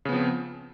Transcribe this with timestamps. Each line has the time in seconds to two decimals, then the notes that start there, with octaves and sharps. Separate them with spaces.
0.05 C#3
0.09 B3
0.12 F3
0.16 C4